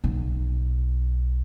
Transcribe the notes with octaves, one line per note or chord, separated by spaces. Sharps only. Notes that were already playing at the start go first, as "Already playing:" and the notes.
B1 B3